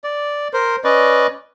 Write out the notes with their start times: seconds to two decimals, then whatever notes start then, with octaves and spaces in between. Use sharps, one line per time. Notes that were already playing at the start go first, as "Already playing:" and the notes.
0.04 D5
0.53 A#4 C5
0.84 C#4 B4 D5 D#5